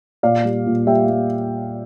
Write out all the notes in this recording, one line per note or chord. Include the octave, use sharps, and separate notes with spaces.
A#2 D5 F5
G3
A#2
G3 E5 G5
G3